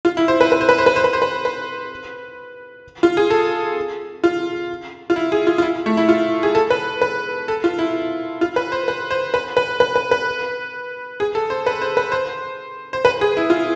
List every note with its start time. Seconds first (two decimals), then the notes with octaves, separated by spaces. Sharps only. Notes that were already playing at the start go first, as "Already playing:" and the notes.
0.05 F4
0.17 E4
0.28 C5
0.41 B4
0.52 B4
0.61 C5
0.69 B4
0.78 C5
0.86 B4
0.96 C5
1.04 B4
1.13 C5
1.22 B4
1.45 B4
3.03 F4
3.17 G#4
3.30 A4
4.24 F4
5.10 F4
5.16 E4
5.32 G#4
5.47 F4
5.58 F4
5.62 E4
5.86 A3
5.97 E4
6.09 F4
6.43 G#4
6.55 A4
6.70 B4
7.02 B4
7.48 A4
7.64 F4
7.79 E4
8.41 F4
8.56 B4
8.72 C5
8.88 B4
9.11 C5
9.34 B4
9.57 B4
9.80 B4
9.95 B4
10.11 B4
11.20 G#4
11.35 A4
11.50 C5
11.66 B4
11.82 C5
11.97 B4
12.12 C5
12.93 C5
13.05 B4
13.21 G#4
13.37 E4
13.50 F4